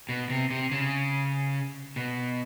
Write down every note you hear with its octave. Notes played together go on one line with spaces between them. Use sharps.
B2
C3
C3
C#3
B2